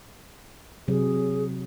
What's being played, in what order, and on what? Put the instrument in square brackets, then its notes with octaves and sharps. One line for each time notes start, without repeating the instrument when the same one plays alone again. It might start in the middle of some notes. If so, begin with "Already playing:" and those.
[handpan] C3 F#3 [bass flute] G#4